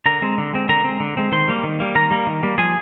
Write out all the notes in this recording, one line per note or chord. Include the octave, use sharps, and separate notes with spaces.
D3 A#4 A#5
G#3 C4
D3
G#3 C4
D3 A#4 A#5
G#3 C4
D3
G#3 C4
D#3 C5 C6
G3 A#3
D#3
G3 A#3
D#3 A#4 A#5
G3 A#3
D#3
G3 A#3
F3 G#4 G#5